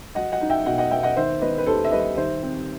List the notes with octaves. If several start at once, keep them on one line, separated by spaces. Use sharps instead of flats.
F#3 D#5 F#5
D#5 F#5
D#4
E5 G5
B2 D#5 F#5
D#5 F#5
B3 E5 G5
D#5 F#5
D#3 C5 E5
B3 B4 D#5
B4
D#2 A4 C5
E5
G3 B4 D#5
D#3 C5 E5
C4